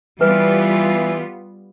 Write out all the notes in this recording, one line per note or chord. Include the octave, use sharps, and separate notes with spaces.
E3 G3 B3 F4 B4